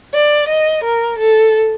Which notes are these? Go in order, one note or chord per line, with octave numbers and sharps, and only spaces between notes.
D5
D#5
A#4
A4